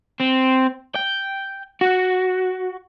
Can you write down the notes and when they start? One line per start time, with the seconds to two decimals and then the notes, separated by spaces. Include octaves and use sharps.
0.20 C4
0.96 G5
1.81 F#4